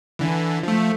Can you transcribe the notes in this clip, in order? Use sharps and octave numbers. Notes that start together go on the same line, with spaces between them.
D3 E3
F3 A3